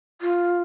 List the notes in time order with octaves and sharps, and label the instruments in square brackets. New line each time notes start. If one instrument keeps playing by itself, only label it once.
[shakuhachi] F4